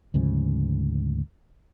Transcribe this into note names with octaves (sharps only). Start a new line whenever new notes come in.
D2 G#2 C#3 F3